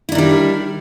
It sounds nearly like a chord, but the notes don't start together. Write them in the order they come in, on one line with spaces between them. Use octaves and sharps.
E4 D4 D#3 G3